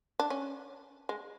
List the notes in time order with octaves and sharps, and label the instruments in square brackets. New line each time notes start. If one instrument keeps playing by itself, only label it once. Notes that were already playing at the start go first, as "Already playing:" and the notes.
[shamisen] D4
C#4
G#3